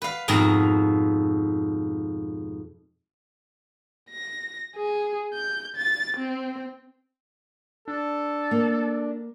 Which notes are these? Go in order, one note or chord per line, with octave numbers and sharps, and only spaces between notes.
B4 F5
F2 G#2 B2 A#5
A#6
G#4
G6
A6
C4
D4 A4
A#3